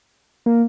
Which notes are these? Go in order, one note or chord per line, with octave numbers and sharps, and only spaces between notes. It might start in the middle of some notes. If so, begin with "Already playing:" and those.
A#3